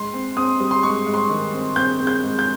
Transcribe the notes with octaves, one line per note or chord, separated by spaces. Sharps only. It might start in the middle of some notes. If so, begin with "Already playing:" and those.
Already playing: G#2 C6
C4
C4 D#6
G3
C6
G#2 C#6
G#2
C6
D#3
C4
C4 G6
C4
G6
G#2
G6